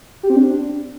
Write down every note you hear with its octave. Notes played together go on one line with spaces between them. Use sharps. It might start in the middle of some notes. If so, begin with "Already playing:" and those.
G4
C4
D4